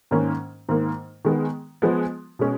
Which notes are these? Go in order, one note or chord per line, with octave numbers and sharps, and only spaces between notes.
G#2 D#3 A#3 C#4
G#2 D#3 A#3
D#3 G#3 B3
F3 G#3 B3
B2 G#3 C#4